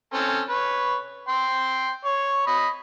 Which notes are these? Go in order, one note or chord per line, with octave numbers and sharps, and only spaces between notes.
C4 C#4 A4
B4 C#5
G5 C6
C#5
D#5 B5